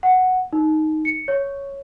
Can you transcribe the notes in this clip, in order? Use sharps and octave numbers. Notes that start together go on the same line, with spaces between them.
F#5
D#4
C#7
C#5